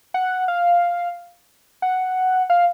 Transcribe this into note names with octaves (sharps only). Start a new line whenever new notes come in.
F#5
F5
F#5
F5